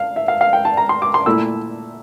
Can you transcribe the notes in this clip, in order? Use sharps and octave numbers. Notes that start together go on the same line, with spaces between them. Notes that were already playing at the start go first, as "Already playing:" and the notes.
Already playing: F5
E5
F5
F5
G5
A5
A#5
C6
D6
C6
A#2 A3 E4 E6